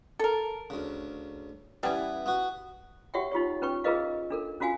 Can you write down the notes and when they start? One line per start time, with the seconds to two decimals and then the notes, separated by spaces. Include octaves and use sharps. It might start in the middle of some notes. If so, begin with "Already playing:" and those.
0.19 A4 A#4
0.70 D2 C#3
1.83 E3 G3 B3 C#4
2.26 B3 F#4
3.14 F#4 G4 C#5 E5 F#5 G5
3.32 D#4 F4 G4 C#5
3.62 C#4 B4 G5 C#6
3.84 F4 G#4 A#4 B4 D#5 F5
4.30 D4 A4 A#4
4.60 C#4 F4 F#4 F5 G#5